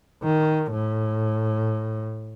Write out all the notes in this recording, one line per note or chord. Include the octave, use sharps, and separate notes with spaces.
D#3
A2